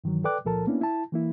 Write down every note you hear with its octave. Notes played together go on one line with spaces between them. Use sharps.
G2 D#3 E3 F#3
A4 B4 D5 G5 D6 F#6
C#2 A#2 F3 A4 A#4 A5
A#3 B3 C#4 D4 E4
E4 A5
E3 A#3 E4